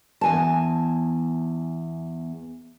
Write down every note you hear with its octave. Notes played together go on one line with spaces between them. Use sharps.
E2 G#5 A5